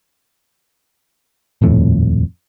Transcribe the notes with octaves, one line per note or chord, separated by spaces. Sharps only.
D#1 F2 A2